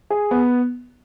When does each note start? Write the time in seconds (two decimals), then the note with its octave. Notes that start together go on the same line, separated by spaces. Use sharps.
0.10 G#4
0.31 B3